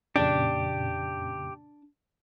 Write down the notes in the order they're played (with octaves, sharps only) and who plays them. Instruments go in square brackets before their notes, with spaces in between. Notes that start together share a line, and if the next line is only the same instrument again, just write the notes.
[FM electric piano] F2 A#2 C#3 [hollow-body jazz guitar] D4 [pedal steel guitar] G4